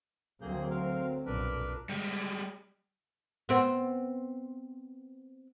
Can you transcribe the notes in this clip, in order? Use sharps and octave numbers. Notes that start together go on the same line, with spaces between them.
D2 F#3 A#3 C4 G#4 G6
A#4 F5
B1 F2 A#2 D4 A#4 B4
G3 G#3
B3 C4